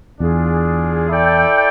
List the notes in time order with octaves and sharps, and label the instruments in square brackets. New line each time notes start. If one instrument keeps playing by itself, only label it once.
[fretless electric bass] E2 [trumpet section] D4 F4 G#4
[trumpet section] E4 A4 D5 G5